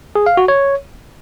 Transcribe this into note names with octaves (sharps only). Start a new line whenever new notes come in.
G#4
F5
F#4
C#5